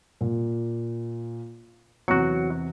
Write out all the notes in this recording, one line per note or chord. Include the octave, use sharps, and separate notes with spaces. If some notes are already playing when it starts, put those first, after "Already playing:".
A#2
E2 C3 F#3 F#4 C#7